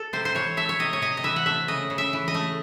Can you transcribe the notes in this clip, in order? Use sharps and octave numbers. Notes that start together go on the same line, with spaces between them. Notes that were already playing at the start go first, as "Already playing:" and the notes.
Already playing: A4
C3 C5
C5
E3 C#5
A3 E5
C#5
C3 D#5
C#5
C3 D#5
D#5
E3 E5
F#5
A3 E5
C#3 D#5
C#3
E5
E3
D#5
A3